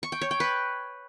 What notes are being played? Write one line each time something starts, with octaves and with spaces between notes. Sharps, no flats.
C#6
G5
C#5
G5
B4